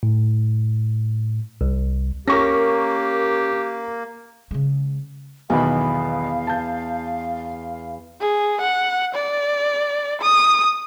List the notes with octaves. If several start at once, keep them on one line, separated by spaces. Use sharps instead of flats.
A2
C2
A#3 C#4 G4 A#4 C#6 A#6
C#3 G#3
B1 E2 B2 D#3 F5 B5
A5 G6
G#4
F#5
D5
D#6